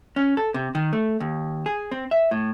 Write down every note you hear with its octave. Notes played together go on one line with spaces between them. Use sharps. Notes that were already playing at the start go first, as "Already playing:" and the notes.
C#4
A4
C3
D#3
A3
D#2
G#4
C4
E5
A2